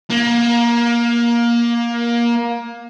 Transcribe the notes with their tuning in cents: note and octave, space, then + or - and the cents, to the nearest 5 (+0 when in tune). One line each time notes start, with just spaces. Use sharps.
A#3 +20